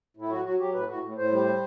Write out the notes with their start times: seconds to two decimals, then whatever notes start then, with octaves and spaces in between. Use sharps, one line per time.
0.17 A2 E4
0.30 F#3 F#4
0.45 F#3 F#4
0.59 F#3 G4
0.74 A2 B4
0.89 A2 F#4
1.03 A2
1.17 A2 C5
1.32 G3